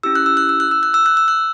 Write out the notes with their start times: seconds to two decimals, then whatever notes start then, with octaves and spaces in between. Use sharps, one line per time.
0.03 C#4 E4 G4 E6
0.15 F#6
0.26 E6
0.37 F#6
0.49 E6
0.60 F#6
0.71 E6
0.83 F#6
0.94 E6
1.06 F#6
1.17 E6
1.28 F#6